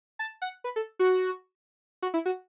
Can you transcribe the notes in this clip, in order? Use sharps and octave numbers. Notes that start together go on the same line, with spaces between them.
A5
F#5
B4
A4
F#4
F#4
E4
F#4